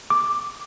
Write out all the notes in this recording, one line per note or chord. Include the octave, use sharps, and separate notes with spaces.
D6